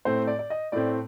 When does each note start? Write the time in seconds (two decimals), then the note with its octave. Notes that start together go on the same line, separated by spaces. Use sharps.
0.05 A2 A3 C4 C5
0.27 D5
0.39 D5
0.50 D#5
0.72 A2 A3 C4 D5